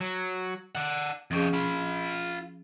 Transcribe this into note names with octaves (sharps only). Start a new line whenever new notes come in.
F#3
D5 F#5
F2 F3 C#4 G4 G#4
F4 B5